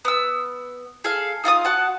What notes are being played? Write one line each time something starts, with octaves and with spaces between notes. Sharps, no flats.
B3 E6
G#4 A4 F5
D#4 F4 A5 D#6
F#4 F#5 A5